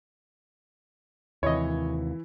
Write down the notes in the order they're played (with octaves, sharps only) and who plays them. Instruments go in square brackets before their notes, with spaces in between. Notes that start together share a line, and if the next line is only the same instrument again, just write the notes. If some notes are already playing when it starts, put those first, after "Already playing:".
[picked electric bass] D#2 C3 [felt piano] E3 E4 [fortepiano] C#5 D#5